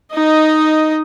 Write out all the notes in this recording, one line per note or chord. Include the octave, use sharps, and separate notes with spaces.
D#4 D#5